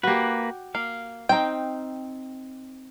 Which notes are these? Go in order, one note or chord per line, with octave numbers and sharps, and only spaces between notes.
A#3 F#4 G4 B4
A#3 F5
C4 D#4 G5